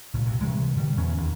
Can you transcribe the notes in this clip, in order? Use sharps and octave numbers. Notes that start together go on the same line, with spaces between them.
C#2 A#2
G2 C3 E3
C3 E3 G3 G#3
B2 D3 E3 G3
E2 B3 C#4
D#2 D#3